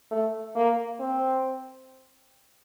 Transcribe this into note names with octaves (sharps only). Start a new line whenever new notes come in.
A3
A#3
C4